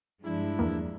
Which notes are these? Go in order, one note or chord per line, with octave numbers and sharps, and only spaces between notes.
G2 F3 G#3 D4 E4
E2 A#3